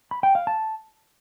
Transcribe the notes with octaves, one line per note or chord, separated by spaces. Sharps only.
B5
G5
F5
A5